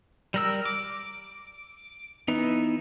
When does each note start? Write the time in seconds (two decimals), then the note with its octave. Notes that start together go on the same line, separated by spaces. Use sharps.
0.34 G3 A#4 E6
0.65 D6
2.28 E3 B3 D#4